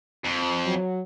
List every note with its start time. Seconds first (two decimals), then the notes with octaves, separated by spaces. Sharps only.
0.25 F2
0.66 F#3